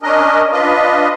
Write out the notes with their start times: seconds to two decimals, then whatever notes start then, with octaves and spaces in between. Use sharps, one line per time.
0.03 C#4 D4 A#4 D#5
0.52 D4 F4 B4 D#5